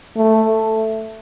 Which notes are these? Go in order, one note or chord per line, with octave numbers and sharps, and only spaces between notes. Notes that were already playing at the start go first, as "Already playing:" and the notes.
A3